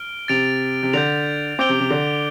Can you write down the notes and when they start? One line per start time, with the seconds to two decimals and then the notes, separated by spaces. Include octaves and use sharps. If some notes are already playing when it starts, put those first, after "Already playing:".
Already playing: F6 D7 G7
0.28 C3 A6 D7 F7
0.83 C3
0.93 D3 G6 F7
1.59 C4 D6 G6 D7 G7
1.69 C3
1.80 C3
1.90 D3